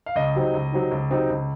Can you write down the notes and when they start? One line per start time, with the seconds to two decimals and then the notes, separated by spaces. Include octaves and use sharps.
0.06 F5
0.15 C#2 D#5
0.35 C3 F#3 C4 D#4
0.54 C#2
0.72 C3 F#3 C4 D#4
0.91 C#2
1.11 C3 F#3 C4 D#4
1.30 C#2